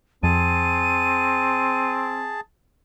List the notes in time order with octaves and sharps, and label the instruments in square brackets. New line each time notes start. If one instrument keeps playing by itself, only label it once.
[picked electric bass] F2 [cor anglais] C4 [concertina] G#4 A5 [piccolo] D#7